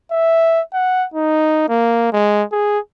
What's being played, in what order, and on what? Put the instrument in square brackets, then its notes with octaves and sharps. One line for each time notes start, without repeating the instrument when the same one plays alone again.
[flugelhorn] E5
F#5
D#4
A#3
G#3
G#4